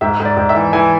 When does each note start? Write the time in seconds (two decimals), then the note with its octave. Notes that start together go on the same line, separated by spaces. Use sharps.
0.01 G#2 E5
0.20 G#2
0.25 D5
0.37 G#2
0.49 E5
0.55 E3
0.73 E3 G#5